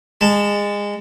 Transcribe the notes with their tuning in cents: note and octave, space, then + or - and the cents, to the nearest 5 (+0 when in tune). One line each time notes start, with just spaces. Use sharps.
G#3 -25 A5 +0